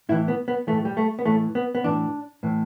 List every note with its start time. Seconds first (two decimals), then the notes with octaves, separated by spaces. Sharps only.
0.09 A2 E3 E4
0.28 B3
0.48 B3
0.67 E3 A3
0.72 A2
0.85 G3
0.97 A3
1.19 B3
1.26 A2 E3 A3
1.55 B3
1.75 B3
1.84 A2 E3 D4
2.43 A2 E3